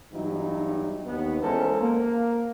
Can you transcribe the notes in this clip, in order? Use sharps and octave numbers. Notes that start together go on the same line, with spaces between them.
G2 E3 F#3 B3 D#4 E4
D#2 B3
E2 G#3 C#4 A4 A#4 C5
A#3